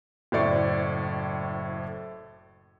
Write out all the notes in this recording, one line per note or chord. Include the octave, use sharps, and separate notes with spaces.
F#1 A2 C5 D5 C#6